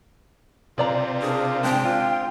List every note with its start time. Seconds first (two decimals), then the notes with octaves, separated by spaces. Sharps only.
0.78 C3 F4 B4 D5 A#5
1.22 D4 G#4 A#4
1.63 G#3 C4 D4 G5
1.85 F4